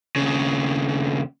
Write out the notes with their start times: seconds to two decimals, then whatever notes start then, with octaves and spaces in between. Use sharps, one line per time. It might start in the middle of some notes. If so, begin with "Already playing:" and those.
0.16 D#2 C#3